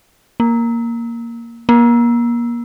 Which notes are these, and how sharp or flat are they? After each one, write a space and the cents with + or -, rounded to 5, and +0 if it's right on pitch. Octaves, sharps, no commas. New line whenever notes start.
A#3 +0
A#3 +30